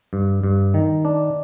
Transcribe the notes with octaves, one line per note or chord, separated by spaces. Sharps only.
G2
G2
D#3
D4